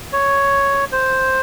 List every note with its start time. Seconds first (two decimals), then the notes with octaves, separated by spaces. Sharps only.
0.13 C#5
0.92 C5